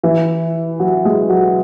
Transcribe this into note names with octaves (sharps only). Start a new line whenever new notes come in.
E3
F#3
G#3
F#3